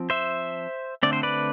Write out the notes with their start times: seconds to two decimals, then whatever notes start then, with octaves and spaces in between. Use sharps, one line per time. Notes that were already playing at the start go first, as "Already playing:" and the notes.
Already playing: F3 C4
0.10 C5 E5
1.03 D3 A3 C4 D5
1.13 C5
1.23 B4 D5